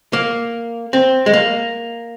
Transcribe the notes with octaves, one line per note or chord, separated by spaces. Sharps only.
A#3
C4
G#3
A#3